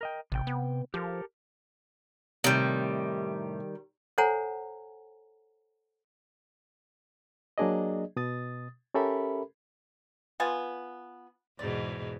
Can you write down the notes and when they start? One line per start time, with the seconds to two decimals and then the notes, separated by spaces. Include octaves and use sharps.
0.01 A#4 D#5 G5
0.32 A1 C3 G5
0.47 B3
0.94 F3 G4 A4 A#4
2.44 A2 C3 D#3 G3
4.18 A4 C5 C#5 F#5 G#5 A#5
7.58 F#3 A#3 D4 G#4 D5 D#5
8.16 B2 D#6 A6
8.94 C#4 G4 A4 A#4 E5 B5
10.40 B3 F4 G#5
11.59 E2 G#2 B2 D5